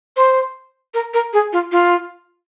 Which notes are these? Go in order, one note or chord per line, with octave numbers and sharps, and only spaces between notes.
C5
A#4
A#4
G#4
F4
F4